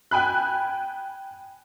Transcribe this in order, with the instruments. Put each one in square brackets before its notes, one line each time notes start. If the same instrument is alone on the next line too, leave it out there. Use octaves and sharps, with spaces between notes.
[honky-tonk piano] G5 G#5 B5 F#6